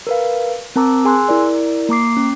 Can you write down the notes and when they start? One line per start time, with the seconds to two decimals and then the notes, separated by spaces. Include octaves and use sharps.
0.07 A#4 B4 F5
0.76 C4 A#4 A5 A#5 D6 E6
1.05 G#4 G#5 C6 E6 F#6
1.29 E4 A#4 D5
1.89 A#3 A#5 D6 C7
2.17 C#4